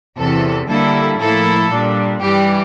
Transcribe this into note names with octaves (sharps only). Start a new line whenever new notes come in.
E2 C3 E3 A4
D3 G3 A#3 E4 A4
A2 F3 A#3 E4 A4
A#2 G3 D4
G2 E3 G3 G4